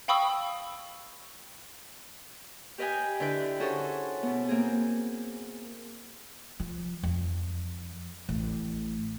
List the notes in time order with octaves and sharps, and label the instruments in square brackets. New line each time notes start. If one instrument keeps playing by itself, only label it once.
[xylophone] F5 G5 B5 C#6 D#6 E6
[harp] G4 B4 D#5 F5 G5 G#5
D3 E4 B4 G5
C#4 F#4 G#4 A4 C5 C#5
B2 B3
A#3 C4 G#4
[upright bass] F3
F2
A1